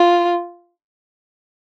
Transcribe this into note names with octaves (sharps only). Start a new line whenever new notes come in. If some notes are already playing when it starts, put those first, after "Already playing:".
Already playing: F4